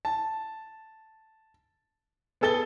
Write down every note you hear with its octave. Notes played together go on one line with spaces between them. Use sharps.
A5
B3 G#4 A4 A6 G7